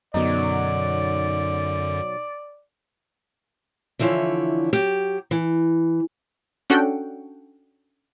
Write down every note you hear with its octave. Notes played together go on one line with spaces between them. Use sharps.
F#2 B2 D3 F#3 D#4 D5
D3 E3 F3 E4 C#5
F#3 G4
E3
C#4 D4 F#4 A4 F#5 G5